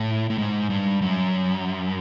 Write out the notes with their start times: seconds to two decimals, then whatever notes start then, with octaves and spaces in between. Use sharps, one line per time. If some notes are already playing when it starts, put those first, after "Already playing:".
Already playing: A2
0.30 A2
0.38 G#2
0.70 G2
1.02 F#2